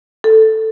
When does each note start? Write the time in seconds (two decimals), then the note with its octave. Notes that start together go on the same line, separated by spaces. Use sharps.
0.24 A4